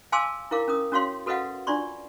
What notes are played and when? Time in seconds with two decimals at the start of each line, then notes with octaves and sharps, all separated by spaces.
0.12 F5 G#5 A5 C6 D6 E6
0.51 E4 A#4 F5 D6
0.68 C#4 A#4 D#6
0.92 C#4 F#4 C#5 F5 C6
1.26 F#4 A4 B4 D#5 F5 F#5
1.67 D4 F4 D5 C6 C#6